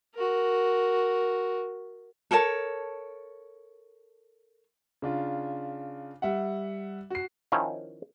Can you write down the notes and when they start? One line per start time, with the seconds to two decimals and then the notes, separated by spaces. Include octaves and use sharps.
0.15 F#4 A#4
2.31 A4 A#4 C#5 A5
5.02 C#3 D4 F4
6.22 G3 E5 F#5
7.10 F#4 C7
7.52 D#3 F3 C#4 E4 C#5